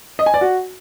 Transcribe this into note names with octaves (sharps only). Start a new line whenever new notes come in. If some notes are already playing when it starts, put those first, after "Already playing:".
D#5
G#5
D5
F#4